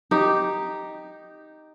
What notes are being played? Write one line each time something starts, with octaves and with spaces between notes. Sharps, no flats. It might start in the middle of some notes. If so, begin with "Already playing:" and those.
D#4 G4